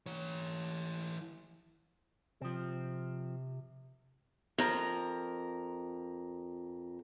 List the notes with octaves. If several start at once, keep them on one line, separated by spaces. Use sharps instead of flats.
E3 C#5
C3 F3 C4
F2 A#4